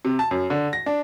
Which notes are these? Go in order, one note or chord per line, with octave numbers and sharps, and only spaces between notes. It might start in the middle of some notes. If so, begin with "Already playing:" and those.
C3
A5
F#2
D3
A#6
D4